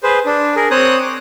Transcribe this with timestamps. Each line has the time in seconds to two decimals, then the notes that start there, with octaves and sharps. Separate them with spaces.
0.03 G#4 B4 C5
0.26 D4
0.56 G#4 A#4
0.71 C4 C5 C#5 D#6 F#6
1.02 D6